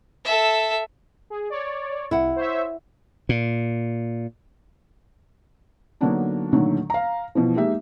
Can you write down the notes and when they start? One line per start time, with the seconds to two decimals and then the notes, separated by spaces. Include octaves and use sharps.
0.24 A4 E5
1.30 G#4
1.50 C#5 D5
2.11 C2 E4 F#5
2.36 C5 C#5 E5
3.29 A#2
6.01 D3 F#3 A#3 B3 D4 D#4
6.53 A#2 D3 D#3 F#3 A3
6.90 F5 A#5
7.35 B2 E3 F3
7.56 G#3 A#3 D#4 G4 E5